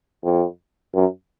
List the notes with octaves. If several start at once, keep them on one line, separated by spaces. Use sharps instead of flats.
F2
F#2